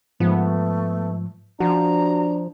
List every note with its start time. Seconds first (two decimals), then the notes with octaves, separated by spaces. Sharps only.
0.20 G#2 F3 A3 B3
1.60 F3 D4 F#4 A#5